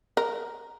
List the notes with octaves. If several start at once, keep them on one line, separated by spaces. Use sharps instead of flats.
A#4